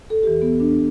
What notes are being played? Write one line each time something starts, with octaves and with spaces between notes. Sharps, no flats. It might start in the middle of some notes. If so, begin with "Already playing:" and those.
A4
E2 E3 G4
B3
D4